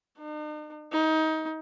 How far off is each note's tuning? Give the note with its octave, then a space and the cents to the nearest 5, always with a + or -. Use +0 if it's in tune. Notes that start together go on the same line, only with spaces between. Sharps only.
D#4 -45
D#4 +25